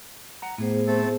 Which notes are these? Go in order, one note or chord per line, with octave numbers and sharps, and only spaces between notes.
F#5 A#5
A2 B3 G#4 C5
A3 C4 A4